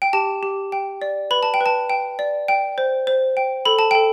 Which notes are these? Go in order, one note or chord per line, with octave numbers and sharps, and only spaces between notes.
G5
G4 A5
G4
G5
D5
B4 B5
A5
G5
B4
A5
G5
D5
G5
C5
C5
G5
A4 B5
A5
A4 G5